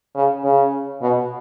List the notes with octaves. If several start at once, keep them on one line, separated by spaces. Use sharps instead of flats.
C#3
C#3
B2